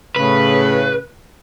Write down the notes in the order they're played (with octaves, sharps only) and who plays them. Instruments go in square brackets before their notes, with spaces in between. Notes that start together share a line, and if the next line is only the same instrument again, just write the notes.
[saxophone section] A2 C#3 [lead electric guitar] B4